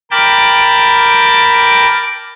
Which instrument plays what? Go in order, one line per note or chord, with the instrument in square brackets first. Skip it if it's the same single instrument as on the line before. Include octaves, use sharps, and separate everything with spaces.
[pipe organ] A#4 G5 A5 B5 D6